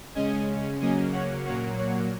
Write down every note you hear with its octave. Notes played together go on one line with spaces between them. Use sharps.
C#3 G#3 C#4 D#5 G#5
C#3 F#3 A#3 C#4 D#5 G#5
C#5 F#5
A#2 F#3 A#3 C#5 F#5
C#5 F#5